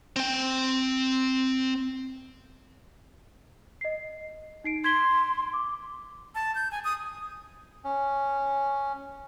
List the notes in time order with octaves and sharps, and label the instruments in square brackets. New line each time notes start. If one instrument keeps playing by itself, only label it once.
[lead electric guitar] C4 G5
[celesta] D#5 C7
D#4 C7 D7
[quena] C6 [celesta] G#6 B6 G7
[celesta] D6
[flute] A5
G6
G#5
D#6
[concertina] C#4